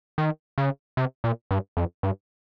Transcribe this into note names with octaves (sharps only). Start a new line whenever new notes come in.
D#3
C#3
C3
A#2
G2
F2
G2